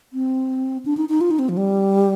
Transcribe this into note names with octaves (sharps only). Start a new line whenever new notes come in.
C4
D4
D#4
D#4
F4
D#4
C4
F3
G3